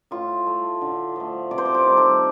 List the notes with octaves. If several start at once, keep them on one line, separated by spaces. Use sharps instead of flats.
A2 F4
A3
D3
F3 A3
C3 D5
C5
D5
G4
D#3 G3
A4